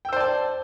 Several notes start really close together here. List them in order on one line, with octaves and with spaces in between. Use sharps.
G5 E6 C5 D5 A5